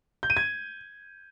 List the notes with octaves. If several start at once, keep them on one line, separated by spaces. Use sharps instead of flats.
G6
D#7
G#6